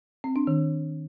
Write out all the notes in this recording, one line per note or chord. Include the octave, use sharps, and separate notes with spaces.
C4
D4
D#3